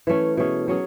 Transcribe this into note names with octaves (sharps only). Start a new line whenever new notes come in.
E3 A3 C#4
B2 A3 C#4 G#4
F#3 C#4 G#4